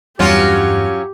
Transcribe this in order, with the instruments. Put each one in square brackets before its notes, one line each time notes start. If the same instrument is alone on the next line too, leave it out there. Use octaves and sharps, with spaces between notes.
[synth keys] E2 G2 [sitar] F#3 C#4 F4 [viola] G4